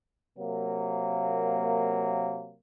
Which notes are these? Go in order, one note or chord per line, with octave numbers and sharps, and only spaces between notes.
C3 F#3 A#3